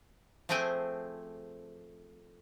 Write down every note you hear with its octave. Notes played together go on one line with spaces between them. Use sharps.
F3 A3 C4 G#4 G5 G#5